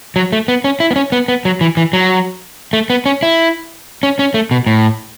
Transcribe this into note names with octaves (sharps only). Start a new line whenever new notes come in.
F#3
A3
B3
C#4
E4
B3
C#4
B3
B3
F#3
E3
E3
F#3
A3
B3
C#4
E4
C#4
C#4
A3
B2
A2